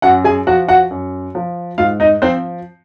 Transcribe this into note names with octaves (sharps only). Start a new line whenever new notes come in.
F#2 F#4 F#5
G#4 G#5
F3 F#4 F#5
F#4 F#5
F#2
F3
G#2 F4 F5
D#4 D#5
F3 C4 C5